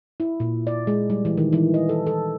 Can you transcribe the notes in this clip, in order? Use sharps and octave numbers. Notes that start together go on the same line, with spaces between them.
E4
A#2
D5
G#3
G3
E3
D#3
E3
D#5
A4
A4